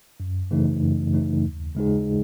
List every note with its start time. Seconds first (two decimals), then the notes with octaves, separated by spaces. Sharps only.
0.20 F#2
0.51 C#3 E3 A3 D#4
0.83 F#2
1.14 C#3 E3 A3 D#4
1.45 D#2
1.75 C#3 G#3 D#4 G#4